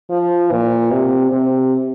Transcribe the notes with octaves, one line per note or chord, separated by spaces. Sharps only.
F3
A#2
C3
C3